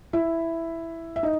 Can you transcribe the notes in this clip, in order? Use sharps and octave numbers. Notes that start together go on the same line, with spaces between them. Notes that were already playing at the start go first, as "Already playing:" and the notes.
E4 E5
E5
D#4 D#5